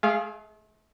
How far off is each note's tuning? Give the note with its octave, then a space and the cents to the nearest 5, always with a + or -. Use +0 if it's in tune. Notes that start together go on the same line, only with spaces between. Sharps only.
A3 -40 G#4 +0 F5 -10